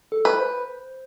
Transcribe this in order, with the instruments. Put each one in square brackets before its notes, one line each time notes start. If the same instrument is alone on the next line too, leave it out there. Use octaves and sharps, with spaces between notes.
[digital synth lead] A4
[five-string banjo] B4
[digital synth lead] C5